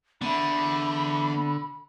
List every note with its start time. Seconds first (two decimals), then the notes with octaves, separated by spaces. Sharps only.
0.21 D3 B3 E5 B5